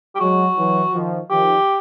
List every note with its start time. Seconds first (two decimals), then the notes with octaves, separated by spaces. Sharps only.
0.15 G4
0.19 F#3 G#3 F#4
0.57 E3 F#3
0.94 D#3 F3
1.30 D#3 F3 G4